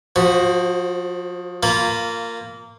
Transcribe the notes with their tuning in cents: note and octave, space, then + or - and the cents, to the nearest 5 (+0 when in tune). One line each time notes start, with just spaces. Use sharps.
F3 +30 F#4 +0 C5 +0
A#3 -15 F4 +0 B5 +20